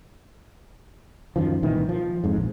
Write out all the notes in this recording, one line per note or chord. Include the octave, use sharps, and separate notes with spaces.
F#2 D#3 F3
C2 A#2 D#3 E3
F3
F2 G#2
A#1